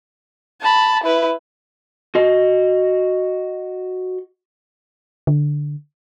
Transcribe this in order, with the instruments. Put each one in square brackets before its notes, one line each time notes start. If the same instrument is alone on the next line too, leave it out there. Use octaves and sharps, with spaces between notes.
[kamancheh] A5 B5
E4 B4
[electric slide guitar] F#4 D#5
[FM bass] D3